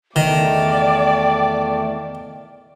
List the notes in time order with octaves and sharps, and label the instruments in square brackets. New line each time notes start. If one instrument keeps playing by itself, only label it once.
[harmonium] E2 A3 [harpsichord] D#3 [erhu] D5 [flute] G5